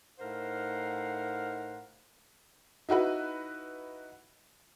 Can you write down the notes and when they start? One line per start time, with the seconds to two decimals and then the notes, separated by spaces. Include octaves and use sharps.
0.19 A2 D#4 A#4 C5 F5 F#5
2.89 D#4 E4 F#4 B4